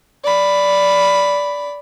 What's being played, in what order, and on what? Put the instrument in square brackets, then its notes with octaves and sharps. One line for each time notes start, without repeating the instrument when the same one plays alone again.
[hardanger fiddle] D5 B5